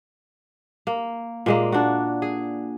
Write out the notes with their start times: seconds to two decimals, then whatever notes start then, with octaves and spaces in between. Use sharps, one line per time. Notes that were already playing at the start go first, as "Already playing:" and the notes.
0.87 A#3
1.46 A#2 G#3 A#3
1.72 D4 F#4
2.22 G#4